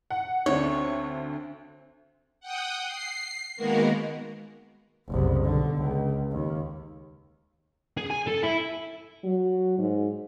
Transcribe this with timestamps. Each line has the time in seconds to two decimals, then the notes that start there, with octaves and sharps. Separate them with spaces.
0.10 F#5
0.46 D2 D3 C4 C#5
2.40 F#5 G5 D#6
2.86 C7
3.56 D#3 G#3 A#3 B3 F#4 A#4
5.08 F#1 C2
5.44 B1 D3
5.77 C#2
6.32 D#2
7.98 G#4
8.11 G#5
8.28 A4
8.44 E4
9.24 F#3
9.78 G#2